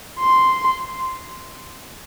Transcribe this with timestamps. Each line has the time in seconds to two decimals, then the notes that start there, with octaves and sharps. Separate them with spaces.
0.19 C6